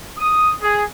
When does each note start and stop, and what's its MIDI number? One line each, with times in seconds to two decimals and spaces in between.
0.17 0.51 87
0.61 0.83 68